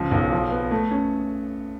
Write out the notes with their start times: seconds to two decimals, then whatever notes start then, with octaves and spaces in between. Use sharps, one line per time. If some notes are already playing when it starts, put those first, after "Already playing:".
Already playing: C#2 F3
0.11 B1
0.32 F3
0.51 B3
0.71 A3
0.91 C#4